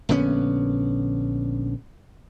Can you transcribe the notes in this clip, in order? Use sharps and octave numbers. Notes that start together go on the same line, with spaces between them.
A#1 D3 B3 C#4